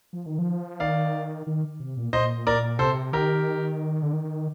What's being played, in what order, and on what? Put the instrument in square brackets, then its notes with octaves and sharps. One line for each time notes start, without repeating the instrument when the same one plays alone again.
[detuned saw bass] F3
D#3
F3
[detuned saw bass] D#3 [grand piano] D5 F5
[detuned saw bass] D#3
C3
A#2
[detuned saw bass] A#2 [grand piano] C5 D#5
[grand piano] A#4 D5
[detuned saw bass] C3 [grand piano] A4 C5
[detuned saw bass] D#3 [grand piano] G4 A#4
[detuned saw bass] D3
D#3